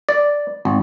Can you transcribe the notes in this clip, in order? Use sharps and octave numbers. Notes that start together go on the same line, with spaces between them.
D5
G#1